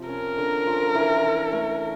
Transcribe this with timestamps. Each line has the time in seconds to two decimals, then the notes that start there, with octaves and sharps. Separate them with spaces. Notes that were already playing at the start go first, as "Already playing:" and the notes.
Already playing: C3 F3
0.09 C#4 A#4
0.37 D3
0.67 F3
0.95 E3
1.23 E3
1.52 A3